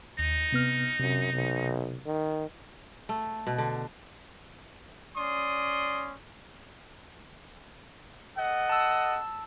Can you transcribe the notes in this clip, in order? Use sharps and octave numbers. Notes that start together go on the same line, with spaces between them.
D#2 D#4
C3 B3 F6
F#2 C3
B1
D#3
A3
B2
D3
C#4 D5 C6 D#6
A4 D#5 F#5
A5 E6